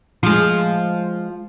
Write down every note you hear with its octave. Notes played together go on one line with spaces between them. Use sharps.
F3 G#3